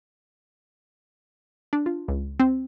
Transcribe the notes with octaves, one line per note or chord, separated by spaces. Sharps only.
D4
F4
C#2
C4